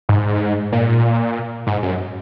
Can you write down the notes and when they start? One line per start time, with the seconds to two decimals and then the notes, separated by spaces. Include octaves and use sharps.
0.09 G#2
0.72 A#2
1.67 G#2
1.83 F#2